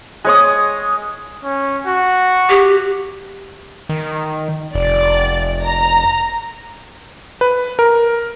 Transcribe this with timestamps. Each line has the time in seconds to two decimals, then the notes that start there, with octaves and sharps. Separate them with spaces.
0.25 G#3 C#5 D#6
1.44 C#4
1.87 F#4
2.50 G4
3.89 D#3
4.75 F1 D5
5.65 A#5
7.41 B4
7.79 A#4